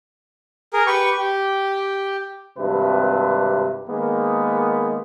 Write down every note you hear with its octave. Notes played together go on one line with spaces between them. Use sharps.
G#4 A#4
G4 B4 C#6
G4
G#1 G2 C3 B4
D#3 G#3 A#3 B3